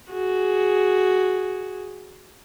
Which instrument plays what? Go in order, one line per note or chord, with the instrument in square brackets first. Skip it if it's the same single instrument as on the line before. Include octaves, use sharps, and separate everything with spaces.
[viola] F#4 G#4